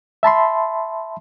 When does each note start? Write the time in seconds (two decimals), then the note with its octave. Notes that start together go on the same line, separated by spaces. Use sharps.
0.23 E5 A5 B5 C6